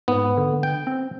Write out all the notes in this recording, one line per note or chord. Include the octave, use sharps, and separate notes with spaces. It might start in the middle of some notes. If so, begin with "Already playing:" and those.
G#2 B3
D3
G5
C4